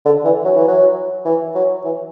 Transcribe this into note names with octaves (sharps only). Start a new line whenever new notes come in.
D3
E3
F#3
E3
F#3
E3
F#3
E3